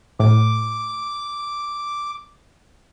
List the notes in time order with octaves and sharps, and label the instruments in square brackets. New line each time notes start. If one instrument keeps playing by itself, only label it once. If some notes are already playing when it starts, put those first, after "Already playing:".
[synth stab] A2 [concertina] D6